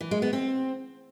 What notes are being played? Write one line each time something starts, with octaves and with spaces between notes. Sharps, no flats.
E3
G#3
B3
C4